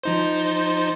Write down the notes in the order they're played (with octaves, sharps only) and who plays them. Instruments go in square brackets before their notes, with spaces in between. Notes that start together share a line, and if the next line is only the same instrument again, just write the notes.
[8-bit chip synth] F3 D#4 C5